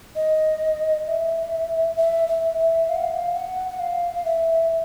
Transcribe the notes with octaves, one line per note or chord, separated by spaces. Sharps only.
D#5
E5
E5
E5
E5
F5
F#5
F5
F#5
F5
F#5
F#5
F5
F5
E5